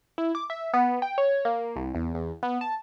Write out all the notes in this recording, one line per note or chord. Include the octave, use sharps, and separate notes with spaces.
E4
D6
E5
B3
G5
C#5
A#3
C2
E2
E2
B3
A5